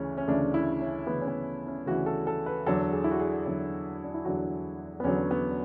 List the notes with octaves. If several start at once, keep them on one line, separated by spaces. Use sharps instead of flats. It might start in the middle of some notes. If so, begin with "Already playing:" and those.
Already playing: D2 C#3 E3 C#4
C#4
D2 C#3 E3 D4
E4
C#4
D2 C#3 E3 B3
C#4
B3
C#4
D2 C#3 E3 F#4
A4
A4
B4
E2 D3 F#3 A4
G#4
E4
F#4
G#4
E2 D3 F#3
D4
E4
E2 D3 F#3 F#4
B3
E2 D3 F#3 C#4
B3